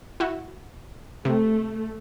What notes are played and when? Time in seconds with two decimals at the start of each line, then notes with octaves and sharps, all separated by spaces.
0.20 E4 F#4
1.25 C3 A3